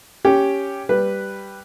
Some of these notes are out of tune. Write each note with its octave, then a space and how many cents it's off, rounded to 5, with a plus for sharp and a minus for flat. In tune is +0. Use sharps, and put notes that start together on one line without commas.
C#4 +5 G4 +0
G3 +0 B4 +0